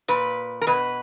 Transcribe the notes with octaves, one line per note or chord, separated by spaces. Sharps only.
A#2 B4
A#4
B2 B4